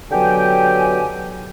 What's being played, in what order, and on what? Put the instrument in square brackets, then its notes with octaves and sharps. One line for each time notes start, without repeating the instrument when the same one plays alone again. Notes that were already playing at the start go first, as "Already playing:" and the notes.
[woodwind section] B2 D3 F#3 G4 G5 G#5